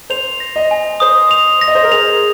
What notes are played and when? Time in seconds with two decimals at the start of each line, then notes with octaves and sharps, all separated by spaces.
0.10 C5 F7
0.40 A#6
0.56 D#5
0.71 G#5
1.00 C5 D#6
1.31 F7
1.61 A#6
1.68 D#5
1.75 C5
1.83 A#4
1.91 G#4 F7